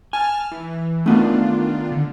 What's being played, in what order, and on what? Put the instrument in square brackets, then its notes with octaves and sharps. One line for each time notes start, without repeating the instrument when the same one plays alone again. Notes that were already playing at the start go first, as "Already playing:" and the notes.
[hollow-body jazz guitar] G#5 [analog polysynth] A5 F6
[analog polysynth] E3
[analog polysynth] D#3 D4 F4 [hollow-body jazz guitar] A3 B3 F#4
[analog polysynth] D3